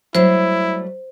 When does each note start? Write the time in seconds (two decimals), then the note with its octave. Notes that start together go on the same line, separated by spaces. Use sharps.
0.15 F#3 G3 A3 E4 C5